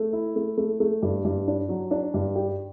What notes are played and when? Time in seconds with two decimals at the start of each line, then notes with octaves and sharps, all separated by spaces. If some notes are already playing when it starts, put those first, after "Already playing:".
Already playing: A3
0.13 E4
0.36 A3
0.57 A3
0.80 A3
1.02 G2
1.25 G2
1.48 D4
1.69 F#3
1.91 D4
2.14 G2
2.36 G4